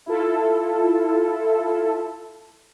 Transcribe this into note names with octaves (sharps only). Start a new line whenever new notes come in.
E4 F4 A4